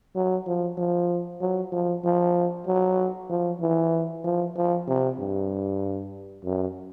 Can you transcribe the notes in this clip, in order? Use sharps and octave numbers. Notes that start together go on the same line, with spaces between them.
F#3
F3
F3
F#3
F3
F3
F#3
F3
E3
F3
F3
C3
G2
F#2